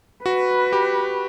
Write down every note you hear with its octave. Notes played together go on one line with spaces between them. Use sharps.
F#4 B4
G4